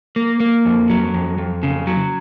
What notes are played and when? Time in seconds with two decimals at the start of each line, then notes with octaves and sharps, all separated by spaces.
0.16 A#3
0.40 A#3
0.65 F2
0.90 F#3
1.14 F2
1.38 F2
1.63 C#3
1.87 F#3